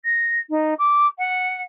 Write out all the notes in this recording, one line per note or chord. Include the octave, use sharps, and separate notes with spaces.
A#6
D#4
D6
F#5